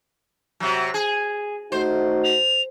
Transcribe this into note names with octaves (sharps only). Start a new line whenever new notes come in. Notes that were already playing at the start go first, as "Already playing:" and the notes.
C3 F#3
G#4
A3 D#4 F#4 C5
F7